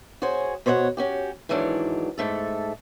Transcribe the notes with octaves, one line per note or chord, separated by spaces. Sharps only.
F#4 G#4 C5 C#5
B2 C5 C#5 D#5 F#5
C#4 F#4 G4
G#2 D#3 E3 F#3 D4
G#2 A3 A4